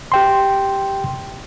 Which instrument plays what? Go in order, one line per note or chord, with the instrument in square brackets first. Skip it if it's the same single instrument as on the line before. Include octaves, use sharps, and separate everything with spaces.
[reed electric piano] G4 G5 C6